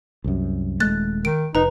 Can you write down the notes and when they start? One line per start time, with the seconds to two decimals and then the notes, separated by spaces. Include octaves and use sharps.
0.24 C2 F#2
0.80 D#1 G#3 A3 F#6 A6
1.25 D#3 D7
1.55 F1 D#4 B4 A#5